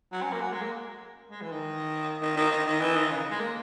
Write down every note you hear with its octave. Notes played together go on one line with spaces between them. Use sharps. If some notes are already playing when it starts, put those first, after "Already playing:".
F#3
C#4
A#3
F#3
G#3
A#3
G#3
E3
D#3
D#3
D#3
D#3
D#3
E3
D#3
C#3
G#3
A#3